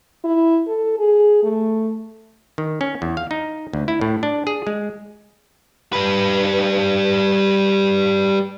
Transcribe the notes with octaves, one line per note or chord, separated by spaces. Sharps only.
E4
A4
G#4
A3
D#3
C#4
E2
F5
D#4
D2
E4
A2
D4
G#4
G#3
G3 B4